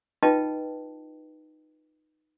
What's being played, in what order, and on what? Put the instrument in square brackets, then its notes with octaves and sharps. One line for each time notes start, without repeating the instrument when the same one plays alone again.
[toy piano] D#4 F4 B4 D#5 G5 A5